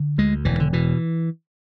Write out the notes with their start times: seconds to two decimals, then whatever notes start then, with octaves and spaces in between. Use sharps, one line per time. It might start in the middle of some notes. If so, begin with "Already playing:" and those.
Already playing: D3
0.18 D2 G#3
0.45 E1 E3
0.60 D3
0.73 B2 E3